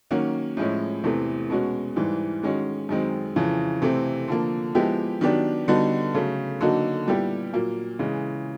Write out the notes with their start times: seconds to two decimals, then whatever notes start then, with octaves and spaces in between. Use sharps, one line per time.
0.11 D#3 F#3 A#3 C#4 F#4
0.57 A2 F3 G#3 C#4 E4
1.04 E2 C3 E3 A3
1.50 B2 G#3 C#4 F#4
1.96 G#2 E3 G3
2.43 D#3 G#3 C#4 F#4
2.89 F#2 D#3 G#3 C4
3.36 F2 C#3 E3
3.82 C3 E3 A3 C4
4.28 D3 F3 A#3
4.75 F3 G#3 B3 E4 G4
5.21 D#3 F#3 B3 D4 G4
5.68 D3 G3 B3 D#4 F#4
6.14 C#3 F#3 A3
6.61 D3 F#3 A#3 D#4 F#4
7.07 A#2 G3 B3 E4 G4
7.54 A#2 F#3 A#3
7.99 C#3 E3 G#3